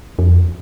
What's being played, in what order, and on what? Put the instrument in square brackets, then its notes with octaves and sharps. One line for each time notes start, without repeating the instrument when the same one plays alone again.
[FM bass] F2